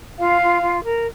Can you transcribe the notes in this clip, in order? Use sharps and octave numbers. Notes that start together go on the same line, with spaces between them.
F4 F5
F4
F4
A#4